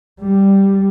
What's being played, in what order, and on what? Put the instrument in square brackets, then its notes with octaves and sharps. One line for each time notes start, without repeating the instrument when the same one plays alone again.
[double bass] G3